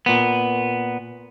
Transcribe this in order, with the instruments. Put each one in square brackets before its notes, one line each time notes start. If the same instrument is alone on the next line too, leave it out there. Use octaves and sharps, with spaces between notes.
[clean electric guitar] A#2 B3